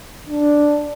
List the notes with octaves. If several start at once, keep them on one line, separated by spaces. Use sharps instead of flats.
D4